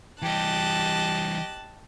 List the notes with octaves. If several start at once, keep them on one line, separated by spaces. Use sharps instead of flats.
E3 G3 G4 D#5 A5 F#6